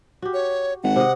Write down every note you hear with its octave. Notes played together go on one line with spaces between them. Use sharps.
F#4 G4
C#5
G#1 F#5
C3 D#5